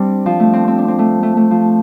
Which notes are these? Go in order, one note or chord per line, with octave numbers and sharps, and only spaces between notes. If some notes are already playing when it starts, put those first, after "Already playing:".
Already playing: G3 C4 D4
F3
A3
C4
C4
D4
C4
A3
A3
A3
F3